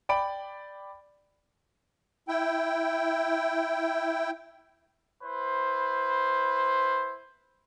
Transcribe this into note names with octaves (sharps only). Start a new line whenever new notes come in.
D5 G5 B5 D7
E4 G5
E4 B4 C5